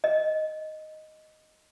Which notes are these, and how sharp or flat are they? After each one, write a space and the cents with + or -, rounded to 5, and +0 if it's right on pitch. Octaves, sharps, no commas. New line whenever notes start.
D#5 +0